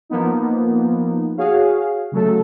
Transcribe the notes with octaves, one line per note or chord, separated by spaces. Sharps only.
F3 A#3 B3 D#4
F#4 G#4 C#5 F5
C#3 F#3 A3 A4